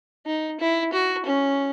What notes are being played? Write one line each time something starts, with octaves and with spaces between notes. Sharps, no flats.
D#4
E4
F#4
C#4